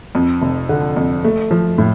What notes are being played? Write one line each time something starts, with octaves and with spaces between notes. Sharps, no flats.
F2
F1
D3
F2
A3
F3
A2